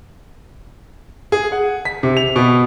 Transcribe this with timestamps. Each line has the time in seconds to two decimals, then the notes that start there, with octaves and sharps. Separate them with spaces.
1.32 G#4
1.52 F#5
1.85 B6
2.03 C3
2.17 F7
2.36 B2